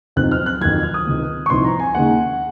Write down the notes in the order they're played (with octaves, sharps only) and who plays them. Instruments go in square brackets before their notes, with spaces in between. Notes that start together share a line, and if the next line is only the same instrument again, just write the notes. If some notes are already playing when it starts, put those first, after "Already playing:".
[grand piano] F2 C3 F#3 C4 D#4 F#6
F6
F#6
F2 D#3 F#3 G#6
F6
D#6
C#2 C3 D#3
C#6
C2 C3 F3 C4 D#4 C6
A#5
G#5
D#2 C#3 G#3 D#4 F#5